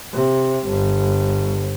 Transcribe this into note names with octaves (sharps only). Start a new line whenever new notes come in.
C3
G1